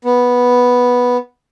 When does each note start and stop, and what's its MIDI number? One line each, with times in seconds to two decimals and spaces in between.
0.05 1.17 59